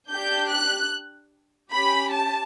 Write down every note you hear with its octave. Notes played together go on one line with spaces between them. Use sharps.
D4 G4 G6
F#6
C#4 G4 B5
A5